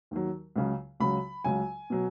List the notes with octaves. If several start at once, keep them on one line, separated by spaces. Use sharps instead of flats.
D#2 D#3 F#3
C#2 C#3 F#3
C#2 C#3 F#3 B5
C#2 C#3 F#3 G#5
B2 F#3